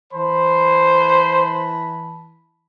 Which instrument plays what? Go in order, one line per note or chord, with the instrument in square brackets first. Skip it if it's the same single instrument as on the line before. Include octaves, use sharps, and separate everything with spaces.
[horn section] E3 A5 B5 [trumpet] C5